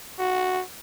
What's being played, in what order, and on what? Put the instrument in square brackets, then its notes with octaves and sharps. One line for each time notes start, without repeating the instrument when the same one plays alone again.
[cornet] F#4